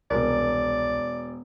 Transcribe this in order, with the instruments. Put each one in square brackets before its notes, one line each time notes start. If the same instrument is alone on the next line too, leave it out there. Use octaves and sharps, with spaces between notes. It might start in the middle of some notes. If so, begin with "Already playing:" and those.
[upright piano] E1 A#4 [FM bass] C2 [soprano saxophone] D5